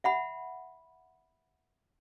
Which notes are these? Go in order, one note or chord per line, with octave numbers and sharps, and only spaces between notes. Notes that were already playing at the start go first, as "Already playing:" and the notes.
E5 F#5 B5